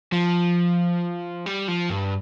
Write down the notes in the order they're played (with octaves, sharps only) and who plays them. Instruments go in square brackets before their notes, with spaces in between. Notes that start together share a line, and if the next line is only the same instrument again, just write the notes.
[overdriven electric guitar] F3
G3
F3
G2